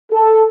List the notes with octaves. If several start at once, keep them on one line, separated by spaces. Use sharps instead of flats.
A4